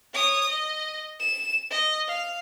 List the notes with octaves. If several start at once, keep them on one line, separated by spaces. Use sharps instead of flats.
C#5 D#6
D#5
E7
D#5
F5